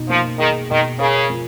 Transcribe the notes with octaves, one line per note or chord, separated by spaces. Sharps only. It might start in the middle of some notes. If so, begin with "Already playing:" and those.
Already playing: B2 D#4
F3 A#3
D#3 G#4
B2 D#3
C#3 A#4
F3